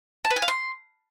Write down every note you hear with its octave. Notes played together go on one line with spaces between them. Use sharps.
A5
B4
G#5
F5
C6